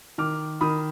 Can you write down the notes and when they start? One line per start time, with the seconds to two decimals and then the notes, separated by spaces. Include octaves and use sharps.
0.18 D#3 D6 F6
0.61 D#3 B5 D#6